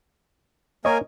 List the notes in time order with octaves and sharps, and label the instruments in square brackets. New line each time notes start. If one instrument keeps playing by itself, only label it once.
[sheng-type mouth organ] A#3 A#4 G#5 [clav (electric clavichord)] C#5 D#5